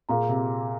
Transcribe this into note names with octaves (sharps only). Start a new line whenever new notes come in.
A#2 G#4 F5 A#5
C3